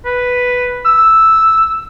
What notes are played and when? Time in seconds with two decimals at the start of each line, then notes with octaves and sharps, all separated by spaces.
0.05 B4
0.85 E6